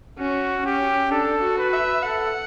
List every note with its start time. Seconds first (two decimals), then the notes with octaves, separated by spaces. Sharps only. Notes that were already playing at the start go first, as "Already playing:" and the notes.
0.19 C#4 F#4
0.66 C#4 G4
1.11 D4 A4
1.43 F#4
1.58 B4
1.73 E5
2.04 A4 F#5